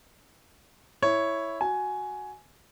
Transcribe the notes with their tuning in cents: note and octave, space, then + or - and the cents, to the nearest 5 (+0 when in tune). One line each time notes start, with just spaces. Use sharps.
E4 +0 C#5 +0
F#4 +0 G#5 +10